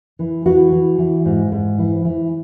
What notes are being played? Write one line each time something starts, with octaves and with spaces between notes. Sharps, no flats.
E3
E3 F#4
E3
E3
G#2
G#2
E3
E3